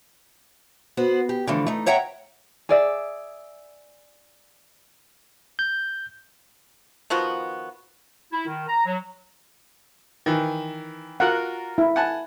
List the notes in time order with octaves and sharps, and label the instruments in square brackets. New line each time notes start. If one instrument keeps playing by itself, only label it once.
[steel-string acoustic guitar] B3 F#4 C5
G4
D3 E3 F3 A3
A3 D#4
C#5 E5 F#5 G5 A#5
[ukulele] G#4 D5 E5
[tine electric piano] G6
[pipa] D#3 F3 B3 F#4
[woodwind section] E4
D#3
A#5
F#3
[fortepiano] D#3 E3
[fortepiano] F4 F#4 A#4 [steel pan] F#5
[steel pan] E4
[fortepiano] F#5 G#5 A5